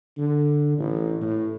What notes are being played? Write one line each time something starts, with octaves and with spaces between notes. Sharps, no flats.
D3
A1
A2